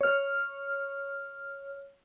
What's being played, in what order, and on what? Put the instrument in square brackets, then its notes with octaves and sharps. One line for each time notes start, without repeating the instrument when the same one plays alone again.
[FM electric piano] C#5 F6